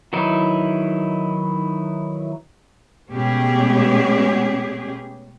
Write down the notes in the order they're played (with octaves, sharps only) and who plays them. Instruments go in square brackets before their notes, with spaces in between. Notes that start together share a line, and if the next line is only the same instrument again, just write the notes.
[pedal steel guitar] D#3 E3 F#3 D#4 E4
[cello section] B2 G#3 A3 C#4 G4 G#4